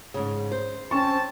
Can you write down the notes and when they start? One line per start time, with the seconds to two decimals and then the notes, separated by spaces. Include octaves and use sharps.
0.14 G#2 C#3
0.51 C5
0.91 C4 C#4 A5 C#6